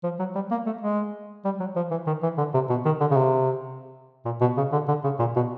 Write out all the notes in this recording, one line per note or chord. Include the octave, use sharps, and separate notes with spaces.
F3
F#3
G3
A#3
A3
G#3
G3
F#3
F3
E3
D#3
E3
D3
C3
B2
D#3
D3
C#3
C3
A#2
B2
C#3
D3
D3
C#3
A#2
B2